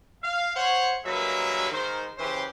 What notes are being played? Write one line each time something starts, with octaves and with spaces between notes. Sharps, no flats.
F5
C5 C#5 F#5
G2 F#3 G#3 A#3 B4 E5
G#2 D#3 A#4 C5
C#3 E3 C#4 G4 B4 C5